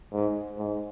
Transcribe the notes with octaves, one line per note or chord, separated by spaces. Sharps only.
G#2
G#2